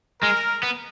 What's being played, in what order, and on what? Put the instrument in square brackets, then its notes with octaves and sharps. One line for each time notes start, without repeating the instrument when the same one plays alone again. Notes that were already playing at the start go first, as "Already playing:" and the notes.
[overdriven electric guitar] G#3 [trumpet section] A#4
[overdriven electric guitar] B3